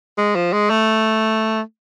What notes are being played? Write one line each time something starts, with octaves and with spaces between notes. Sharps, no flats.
G#3
F3
G#3
A3